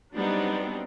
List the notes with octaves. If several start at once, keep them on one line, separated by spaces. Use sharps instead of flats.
F#3 G3 B3 C4 D4 D#4